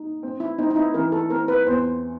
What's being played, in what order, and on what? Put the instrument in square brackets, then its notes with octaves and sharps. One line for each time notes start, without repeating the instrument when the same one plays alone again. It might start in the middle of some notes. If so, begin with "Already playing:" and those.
Already playing: [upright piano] D#4
C4
[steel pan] E4
[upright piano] C4 [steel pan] D#4
[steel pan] D#4
E4
[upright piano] E3 [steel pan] A#4
[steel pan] A4
[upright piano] C4 [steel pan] A#4
[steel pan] B4
[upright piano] E2 [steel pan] C5